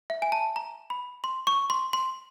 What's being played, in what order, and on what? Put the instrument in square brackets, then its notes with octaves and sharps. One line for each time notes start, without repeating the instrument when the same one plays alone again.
[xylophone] E5
G#5
A5
A#5
B5
C6
C#6
C6
C6